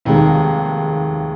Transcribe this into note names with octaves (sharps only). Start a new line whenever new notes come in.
F1 D#2 D#3 G#3